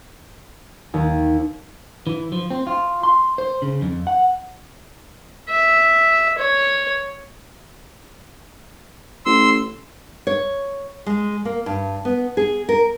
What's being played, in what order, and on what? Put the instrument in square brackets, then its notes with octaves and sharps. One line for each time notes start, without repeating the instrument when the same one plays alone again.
[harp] D#2
[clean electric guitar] E3
F3
C4
F4
C6
C5
C#3
F2
F#5
[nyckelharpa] E5
C#5
[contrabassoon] A1 [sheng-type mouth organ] C6 E6
[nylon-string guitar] C#5
G#3
A#3
G2
B3
G#4
A#4